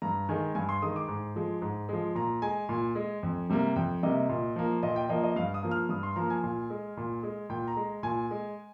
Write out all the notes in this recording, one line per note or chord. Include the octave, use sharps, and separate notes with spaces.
G2 A#5
D#3 G#3 G#5
G2 G#5
C6
D#3 G#3 D#6
D6
G#2
F3 G#3
G#2
F3 G#3
A#2 A#5
G#3 G#5
A#2
G#3
F2
C3 G3 A#3
F2 G5
C3 G3 A#3 D#5
A#2
F3 A#3
A#2 D#5
G5
F3 A#3 D#5
D#5
G2 F5
D#6
F3 A#3
F6
G2 D#6
C6
F3 A#3 A#5
G#5
A#2
G#3
A#2
G#3
A#2 G5
A#5
G#3
A#2 G#5
G#3